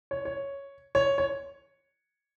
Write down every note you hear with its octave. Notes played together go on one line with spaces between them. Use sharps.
C#5
C#5
C#5
C#5